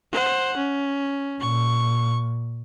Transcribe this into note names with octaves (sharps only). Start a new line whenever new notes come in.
C5 F#5
C#4
A#2 C#6